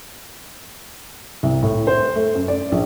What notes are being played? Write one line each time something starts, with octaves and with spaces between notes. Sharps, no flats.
C2
A2
C5
A3
F#2
D5
A#1